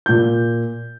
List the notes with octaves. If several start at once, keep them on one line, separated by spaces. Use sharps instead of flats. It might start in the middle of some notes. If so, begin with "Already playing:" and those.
A#2 G6